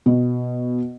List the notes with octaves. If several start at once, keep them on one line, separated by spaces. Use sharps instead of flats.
B2